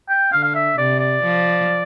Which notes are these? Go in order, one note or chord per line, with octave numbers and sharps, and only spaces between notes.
G5
D3 F5
F5
E5
C3 D5
D5
F3